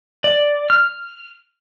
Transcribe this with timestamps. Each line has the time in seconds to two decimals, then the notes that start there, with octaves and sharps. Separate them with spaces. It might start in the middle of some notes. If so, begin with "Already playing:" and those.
0.24 D5
0.70 F6